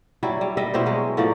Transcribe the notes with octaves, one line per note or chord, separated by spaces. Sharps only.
F#3 G3 E4
G3
G3 D#5 E5
B2 E4 G4 C5
F#3 G#3
A2 F3 F#3 D5